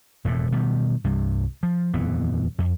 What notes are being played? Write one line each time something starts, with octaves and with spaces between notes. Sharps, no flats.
E1 F2 A2
B2 D#3 G3
C2 G2 C3
F3
D#1 F2 E3 B3
F2